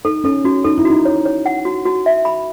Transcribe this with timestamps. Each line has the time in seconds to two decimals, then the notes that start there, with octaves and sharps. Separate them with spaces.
0.05 D#4 A4
0.24 C#4 A4
0.44 C#4 F#4
0.64 D#4 A4
0.78 E4
0.85 F#4
0.90 D#4
1.05 C#5
1.25 C#5
1.46 F#5
1.65 F#4
1.85 F#4
2.06 E5
2.25 B5